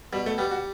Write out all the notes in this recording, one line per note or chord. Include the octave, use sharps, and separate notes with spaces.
B2 G3
A3
G3 B3
F#4